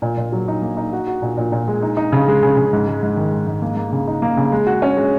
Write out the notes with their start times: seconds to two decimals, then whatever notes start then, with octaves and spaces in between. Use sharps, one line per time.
0.02 A#2
0.17 A#2
0.32 F#3
0.48 D#4
0.62 A#3
0.77 D#4
0.93 F#4
1.07 F#4
1.22 A#2
1.37 A#2
1.52 A#2
1.68 G#3
1.82 D#4
1.97 D#4
2.12 C#3
2.28 G#3
2.43 C#3
2.57 C#3
2.73 G#2
2.87 G#3
3.02 G#2
3.17 D#3
3.32 G#3
3.47 G#2
3.62 A#3
3.77 A#3
3.92 C#3
4.07 D#4
4.22 A#3
4.37 C#3
4.52 G#3
4.67 F#4
4.82 C#4
4.97 G#3